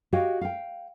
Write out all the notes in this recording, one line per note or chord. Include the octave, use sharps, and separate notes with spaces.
F#4 G4 C#5 D#5 F5 G5
F5 G5